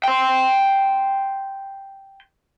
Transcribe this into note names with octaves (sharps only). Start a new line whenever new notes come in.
G5 C6